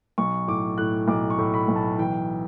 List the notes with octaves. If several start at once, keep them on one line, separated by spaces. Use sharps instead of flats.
B1 C#6
A2 D6
A2 F#6
B1 D6
C#6
A2
B5
B1
A5
E3 G5